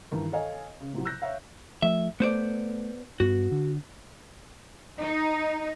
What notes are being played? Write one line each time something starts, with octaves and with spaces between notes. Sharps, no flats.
G2 D#3 E3
A4 C#5 D#5 F5 G#5
C#3
A2 C3 F3 F#3
E6 F#6 G6 A#6
C#5 E5 F5
F3 A3 E5
A3 B3 C5 D5
G2 B3 F#4
D3
D#4